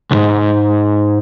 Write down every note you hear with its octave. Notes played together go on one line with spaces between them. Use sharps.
B1 G#2